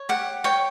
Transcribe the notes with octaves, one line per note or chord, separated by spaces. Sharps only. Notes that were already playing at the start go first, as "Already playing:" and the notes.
Already playing: C#5
G4 F#5
C#5 G5